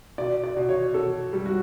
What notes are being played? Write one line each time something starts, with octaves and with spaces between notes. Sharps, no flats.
B2 D5
D5
B2
C#5
B2 A4
G3
F#4